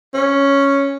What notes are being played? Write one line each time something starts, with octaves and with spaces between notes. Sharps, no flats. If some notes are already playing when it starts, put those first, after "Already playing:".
C#4